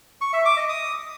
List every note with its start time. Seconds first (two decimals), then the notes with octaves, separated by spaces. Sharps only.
0.21 C#6
0.33 E5
0.45 D6
0.57 D#5
0.69 D#6